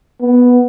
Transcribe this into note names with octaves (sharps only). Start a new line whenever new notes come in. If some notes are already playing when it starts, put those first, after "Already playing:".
B3